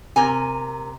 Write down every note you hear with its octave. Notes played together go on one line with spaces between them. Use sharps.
C3 A#4 G#5